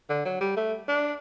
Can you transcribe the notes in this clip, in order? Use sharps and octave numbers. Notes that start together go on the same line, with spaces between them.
D3
F#3
G3
A3
D4